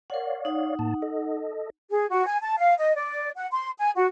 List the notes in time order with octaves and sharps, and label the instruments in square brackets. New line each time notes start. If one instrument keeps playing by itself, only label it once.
[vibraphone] A#4 F#5 [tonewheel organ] C#5 D5 F5
[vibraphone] D#4 F#5
[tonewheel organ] A2 A#3 A5
A4 D#5
[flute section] G#4
F#4
G#5
A5
F5
D#5
D5
F#5
C6
G#5
F#4